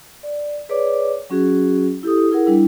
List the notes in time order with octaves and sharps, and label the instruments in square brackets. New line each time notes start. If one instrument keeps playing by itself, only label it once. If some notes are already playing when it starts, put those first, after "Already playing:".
[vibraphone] D5
G#4 B4 C#5 D5 D6
F#3 C#4 F#4 G#4
E4 G4 A4 D#6
E4 G#4 A#4 F#5
G3 D4 E4